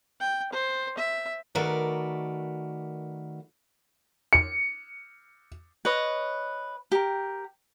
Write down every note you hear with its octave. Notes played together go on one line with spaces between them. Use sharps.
G5
C5
E5
D#3 A3 F#4 A#4 B4 D5
C#7
B4 C#5 D#5
G4 A#4